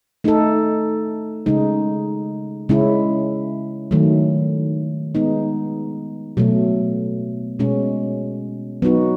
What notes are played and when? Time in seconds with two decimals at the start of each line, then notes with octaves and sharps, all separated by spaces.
0.24 A3 D#4 A4
1.46 C#3 G#3 D#4
2.69 C#3 G#3 C#4 E4
3.91 D#3 F#3 A3
5.15 G#3 B3 D#4
6.37 B2 F#3 A3
7.59 B2 G#3 C#4
8.82 F#3 B3 D#4 F#4